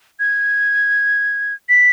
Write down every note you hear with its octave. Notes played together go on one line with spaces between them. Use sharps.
G#6
B6